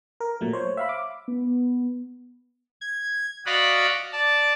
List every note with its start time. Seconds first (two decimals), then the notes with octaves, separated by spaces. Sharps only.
0.20 A#4
0.41 A#2 F#3 A3
0.53 C5 C#5
0.77 E5 F5 B5
0.89 D6
1.28 B3
2.81 G#6
3.46 F#4 D5 D#5 F5 F#5 B5
4.12 D5 A5